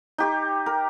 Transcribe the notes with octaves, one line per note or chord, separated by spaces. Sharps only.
D#4 G4 C#6
A#4